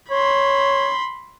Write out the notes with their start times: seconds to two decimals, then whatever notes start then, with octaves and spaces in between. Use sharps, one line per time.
0.11 C#5 B5 C6